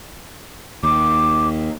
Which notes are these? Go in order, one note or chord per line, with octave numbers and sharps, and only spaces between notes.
D#2 D6